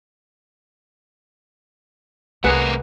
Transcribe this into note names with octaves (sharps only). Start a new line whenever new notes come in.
C2 A3 C4 G#4 A#4 B4 F#5